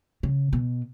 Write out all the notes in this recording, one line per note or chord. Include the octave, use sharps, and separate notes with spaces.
C#3
B2